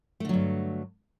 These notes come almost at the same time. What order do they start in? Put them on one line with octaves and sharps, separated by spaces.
A3 D3 F#3 G2